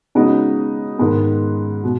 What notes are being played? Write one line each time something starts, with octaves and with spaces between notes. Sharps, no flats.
C#3 G#3 B3 D#4 F#4
G#2 D#3 G#3 B3
B2